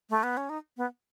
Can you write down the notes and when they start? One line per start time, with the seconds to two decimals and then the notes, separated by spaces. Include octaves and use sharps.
0.10 A3
0.23 B3
0.37 C#4
0.49 D#4
0.77 B3